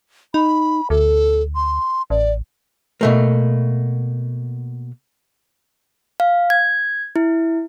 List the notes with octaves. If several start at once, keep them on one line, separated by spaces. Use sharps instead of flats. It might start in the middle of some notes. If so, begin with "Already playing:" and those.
D#4 B5
D2 A4
C6
A1 D5
B2 A3 A#3
F5
G#6
E4